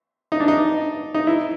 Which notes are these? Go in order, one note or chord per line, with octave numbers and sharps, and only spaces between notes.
D#4
D4
D#4
D#4
E4